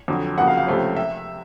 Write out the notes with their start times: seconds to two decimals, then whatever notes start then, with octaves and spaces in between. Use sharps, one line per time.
0.08 F2 D3 F#3
0.37 F#1 F2 C#3 F#3 F#5
0.47 F5
0.58 F5
0.67 C#2 C3 F3 A3 C#4
0.96 E5